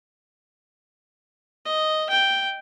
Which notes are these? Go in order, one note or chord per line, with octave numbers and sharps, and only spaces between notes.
D#5
G5